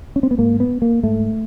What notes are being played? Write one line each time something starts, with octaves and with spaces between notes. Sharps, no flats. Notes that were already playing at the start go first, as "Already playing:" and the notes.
C#4
C4
B3
G#2 A#3
B3
A#3
G#2 A3